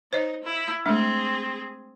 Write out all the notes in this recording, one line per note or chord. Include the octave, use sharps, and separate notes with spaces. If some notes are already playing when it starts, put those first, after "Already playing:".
D#4 C5 C#5 D#5
E4
G#3 A3 C4 D4 G#4